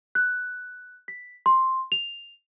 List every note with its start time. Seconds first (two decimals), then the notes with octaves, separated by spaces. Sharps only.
0.15 F#6
1.08 B6
1.46 C6
1.92 F7